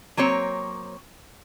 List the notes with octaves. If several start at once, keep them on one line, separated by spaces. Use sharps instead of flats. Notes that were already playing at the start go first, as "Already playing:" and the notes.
F#3 A#3 C4 C#5